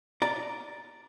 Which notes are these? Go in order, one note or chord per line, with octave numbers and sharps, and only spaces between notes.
D5 A#5